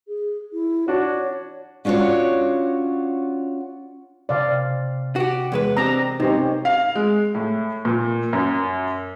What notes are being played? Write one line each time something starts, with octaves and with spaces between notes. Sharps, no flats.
G#4
E4
D4 F#4 C#5
C#4 D4 F4 F#4 C#5
C3 D5 F5
F#4 G4
E2 G#3 B4
C4 D4 G4 A#5
C3 C#4 D#4 G4 C5 D#5
F5
G#3
A2
A#2
F#2